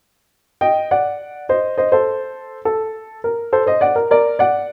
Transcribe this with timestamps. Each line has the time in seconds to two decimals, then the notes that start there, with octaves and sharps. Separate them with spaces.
0.61 D#5 G5
0.91 D5 F#5
1.49 C5 D#5
1.78 C5 D#5
1.92 A4 C5
2.65 A4
3.24 A#4
3.53 A4 C5
3.66 C5 D#5
3.81 D5 F#5
3.96 A#4
4.11 A#4 D5
4.39 D5 F#5